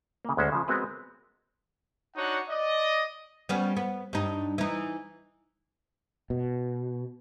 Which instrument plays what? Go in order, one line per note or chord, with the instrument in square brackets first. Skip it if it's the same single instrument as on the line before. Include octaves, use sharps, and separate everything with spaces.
[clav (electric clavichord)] C#3 A#3
D2 G#3 C#4 C5
C#3 F3
G#3 B3 C4 F#4 A#4 B4
[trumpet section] D4 D#4 F#4 C#5 F#5
D5 D#5
[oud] G3 B3 C#4
B3
G2 D#4
E3 D#4
[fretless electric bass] B2